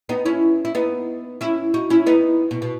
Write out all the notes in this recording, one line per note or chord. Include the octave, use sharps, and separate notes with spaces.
B3 D#4
C#4 E4
E4
B3 D#4
C#4 E4
D#4 F#4
C#4 E4
B3 D#4
B2
B2